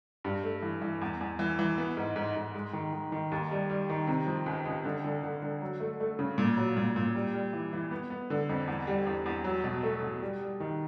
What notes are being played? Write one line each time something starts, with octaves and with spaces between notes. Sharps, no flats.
G2
A3
E3
E3
E2
E2
E3
E3
B3
G#2
G#2
G#2
G#3
D#3
D#3
D#3
D#2
G3
G3
D#3
C3
F3
C#2
C#2
D3
D3
D3
D3
F#3
A3
A3
C#3
A#2
F#3
A#2
A#2
G3
G3
E3
E3
B3
B3
D3
F2
E2
G3
E2
E2
F#3
B2
A3
B2
G3
G3
D#3